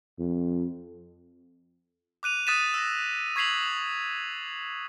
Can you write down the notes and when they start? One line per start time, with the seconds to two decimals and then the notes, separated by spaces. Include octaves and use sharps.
0.19 F2
2.23 D6 F#6 D#7 F7
2.47 D#6 F#6 A6 B6 D#7 E7
2.74 E6 A#6
3.36 C#6 G#6 B6 C7 F7 F#7
3.63 F7